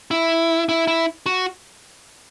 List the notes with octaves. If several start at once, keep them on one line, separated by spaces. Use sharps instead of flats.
E4
E4
E4
F#4